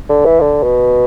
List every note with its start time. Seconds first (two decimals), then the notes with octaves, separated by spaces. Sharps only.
0.09 D3
0.26 E3
0.41 D3
0.63 B2